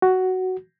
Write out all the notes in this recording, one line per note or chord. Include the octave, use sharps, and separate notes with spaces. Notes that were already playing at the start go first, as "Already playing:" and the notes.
F#4